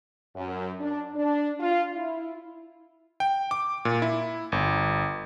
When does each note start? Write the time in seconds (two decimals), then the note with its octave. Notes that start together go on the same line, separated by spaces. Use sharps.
0.35 F#2
0.80 D4
1.14 D4
1.60 F4
1.96 E4
3.20 G5
3.51 D6
3.85 A#2
4.02 E4
4.52 G1